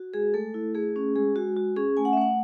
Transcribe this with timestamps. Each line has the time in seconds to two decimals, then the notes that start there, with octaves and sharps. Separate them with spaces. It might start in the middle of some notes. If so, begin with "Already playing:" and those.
Already playing: F#4
0.14 G#3 G#4
0.34 A3 A4
0.54 E4
0.75 A3 G#4
0.96 C#4
1.15 G#3 G#4
1.36 G#3 F#4
1.56 F#4
1.77 C#4 G#4
1.97 A3 G#5
2.05 F#5
2.13 E5
2.17 A3 F#5